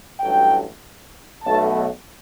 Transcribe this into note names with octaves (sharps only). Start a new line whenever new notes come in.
A1 G2 F#3 A3 G5
B1 B2 A3 A5